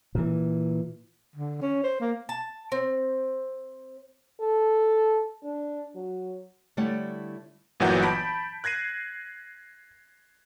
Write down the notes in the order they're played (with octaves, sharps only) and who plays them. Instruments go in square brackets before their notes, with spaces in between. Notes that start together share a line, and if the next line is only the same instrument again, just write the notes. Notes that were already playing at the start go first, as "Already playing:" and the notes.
[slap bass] A#2 E3
[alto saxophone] D3
C#4
C5
A#3
[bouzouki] A5
C4
[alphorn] A4
D4
F#3
[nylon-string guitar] D3 G3 A3 E4 C#5 F#5
[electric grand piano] G1 A#2 E3 F#3 F#5 G6
A5 B5 B6 D7
F#6 G#6 A#6 C7 D#7